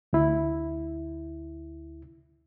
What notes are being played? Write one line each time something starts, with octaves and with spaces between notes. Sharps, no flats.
D2 E4